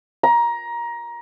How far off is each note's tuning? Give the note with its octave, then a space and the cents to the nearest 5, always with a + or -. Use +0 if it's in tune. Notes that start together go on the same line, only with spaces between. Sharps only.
A#5 +20